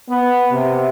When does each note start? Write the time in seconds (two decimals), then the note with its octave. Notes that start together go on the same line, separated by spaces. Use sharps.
0.10 B3
0.51 C3